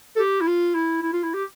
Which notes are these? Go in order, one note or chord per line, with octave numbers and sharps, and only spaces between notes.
A4
G4
E4
F4
E4
E4
F4
E4
G4